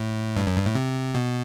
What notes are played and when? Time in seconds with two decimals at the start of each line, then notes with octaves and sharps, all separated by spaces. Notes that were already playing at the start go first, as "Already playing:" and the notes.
Already playing: A2
0.37 G2
0.47 F#2
0.57 G2
0.66 A2
0.75 C3
1.15 B2